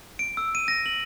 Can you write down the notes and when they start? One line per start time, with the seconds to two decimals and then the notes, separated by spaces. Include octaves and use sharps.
0.19 D7
0.37 E6
0.55 D#7
0.68 A#6
0.86 F#7